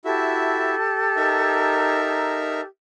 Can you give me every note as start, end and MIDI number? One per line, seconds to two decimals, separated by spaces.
0.05 0.75 64
0.05 0.75 66
0.05 2.65 67
0.05 2.65 69
0.05 0.75 76
0.05 2.65 81
1.16 2.61 63
1.16 2.61 70
1.16 2.61 76